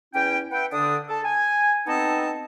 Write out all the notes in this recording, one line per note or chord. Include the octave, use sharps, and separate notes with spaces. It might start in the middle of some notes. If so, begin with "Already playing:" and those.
E2 C#4 E4 G5
B4 E5 F#5 G5
D3 D4 D#6
A4 A5
G#5
B3 C4 D#4 A4 D#5 A5